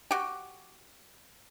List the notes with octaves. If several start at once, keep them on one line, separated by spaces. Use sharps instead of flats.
F#4 G4